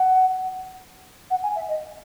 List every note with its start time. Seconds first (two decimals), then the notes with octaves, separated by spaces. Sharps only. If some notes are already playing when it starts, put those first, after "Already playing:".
Already playing: F#5
1.30 F#5
1.43 G#5
1.56 E5
1.68 D#5